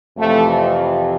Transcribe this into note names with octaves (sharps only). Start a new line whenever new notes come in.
F2 C3 E3 F3 A3